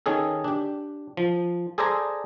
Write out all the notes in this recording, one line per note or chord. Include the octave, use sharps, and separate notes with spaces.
D#3 C#4 G#4 A4
D4 G4
F3
G#4 A4 C5 D5 G#5 A#5